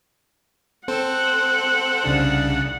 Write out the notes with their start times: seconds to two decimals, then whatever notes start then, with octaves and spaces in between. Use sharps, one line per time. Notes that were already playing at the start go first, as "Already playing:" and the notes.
0.88 C4 A4 C5 F#5
2.04 C2 C#3 D4